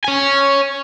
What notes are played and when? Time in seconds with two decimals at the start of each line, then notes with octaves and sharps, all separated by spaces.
0.04 C#5 G#5